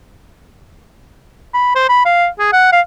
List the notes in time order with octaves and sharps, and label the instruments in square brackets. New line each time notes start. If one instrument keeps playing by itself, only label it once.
[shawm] B5
C5
B5
F5
G#4
F#5
F5